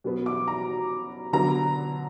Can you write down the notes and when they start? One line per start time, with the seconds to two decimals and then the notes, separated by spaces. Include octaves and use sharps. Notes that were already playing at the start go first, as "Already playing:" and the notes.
0.04 B2 F#3 B3
0.26 D6
0.48 A#5
1.33 D3 F#3 B3 A#5